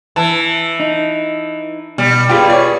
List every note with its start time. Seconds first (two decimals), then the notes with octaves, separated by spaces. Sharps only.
0.16 E3 A5
0.80 D#4
1.98 B2 G3
2.29 F4 G4 G#4 B4 G5
2.50 C#5 D5